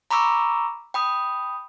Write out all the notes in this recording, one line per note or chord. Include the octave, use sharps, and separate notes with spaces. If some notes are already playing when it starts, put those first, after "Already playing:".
A#5 B5 C#6 D6 E6
G5 B5 D#6